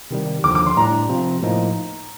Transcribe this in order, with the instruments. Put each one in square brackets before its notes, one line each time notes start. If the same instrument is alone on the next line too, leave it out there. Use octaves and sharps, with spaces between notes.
[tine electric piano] C3 D#3 G3
[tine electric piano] D#2 D3 F3 [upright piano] D6
[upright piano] D6
C6
[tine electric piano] A2 G3 D4 [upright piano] A#5
[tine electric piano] C3 F3 C4 F4
A2 F3 A#3 D#4